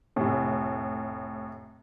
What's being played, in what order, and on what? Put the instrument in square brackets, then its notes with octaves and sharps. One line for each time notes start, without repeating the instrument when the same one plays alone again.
[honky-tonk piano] F1 A2